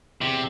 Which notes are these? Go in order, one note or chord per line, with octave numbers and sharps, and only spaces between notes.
E2 C3